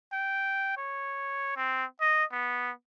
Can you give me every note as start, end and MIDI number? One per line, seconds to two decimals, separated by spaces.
0.12 0.74 79
0.77 1.56 73
1.57 1.85 60
2.01 2.24 75
2.32 2.71 59